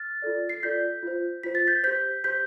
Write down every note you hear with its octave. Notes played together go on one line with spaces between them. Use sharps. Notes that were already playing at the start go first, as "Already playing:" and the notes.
Already playing: F6 A6
F4 A4 D5
C7
F4 A4 D5 G6 B6
F4 C5
F4 C5 B6
A6
G6 B6
G4 C5 G6 B6
G4 C5 G6 B6